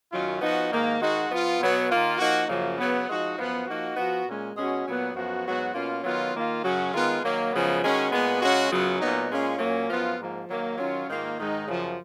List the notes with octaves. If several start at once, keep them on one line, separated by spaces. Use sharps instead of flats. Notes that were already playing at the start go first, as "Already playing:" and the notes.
F#2 D#3 F#3 C#4 F4
F3 B3 D#4 F#4
G#2 D#3 A#3
D#3 G#3 D#4 F#4
F3 B3 F4
B2 F#3 B3
D#3 A#3 F4
F3 A#3 D#4 F#4
F#2 C#3 F3 A#3
C#3 F#3 B3
F3 G#3 D#4 F#4
F#2 F3 B3
F3 A#3 D#4 F#4
F3 B3 F#4
A#2 G#3 C#4
B2 G#3 C#4 F#4
A#2 F#3 B3
F#2 F3 B3 F#4
G#2 F#3 B3 F#4
B2 A#3 C#4 F4
D#3 F#3 B3 F4
D#3 A#3 F4
F#2 C#3 F#3 C#4 F#4
D#3 G#3 B3 F4
D#3 F#3 A#3
F#2 C#3 F3 G#3 B3
D#3 G#3 C#4 F#4
A#2 G#3 B3
C#3 G#3 C#4 F#4
F#2 C#3 F#3 B3 F4
A#2 F#3 B3 D#4
A#2 G#3 C#4 F4
A#2 F#3 A#3 C#4
F#2 F3 B3 F4
G#2 F3 A#3
D#3 F#3 A#3
D#3 F#3 C#4 F4
G#2 D#3 A#3 F4
G#2 D#3 G#3 D#4
F#2 C#3 F3